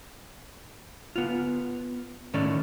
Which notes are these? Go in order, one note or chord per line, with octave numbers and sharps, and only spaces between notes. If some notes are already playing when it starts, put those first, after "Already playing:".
B3 F4
A2 D#3 C#4 D5